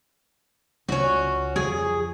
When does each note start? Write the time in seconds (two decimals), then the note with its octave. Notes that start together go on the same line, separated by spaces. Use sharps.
0.89 C#2 C#4 F#4
1.56 F2 G#4